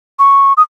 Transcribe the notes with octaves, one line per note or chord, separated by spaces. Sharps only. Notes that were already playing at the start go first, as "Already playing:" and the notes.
C#6
D#6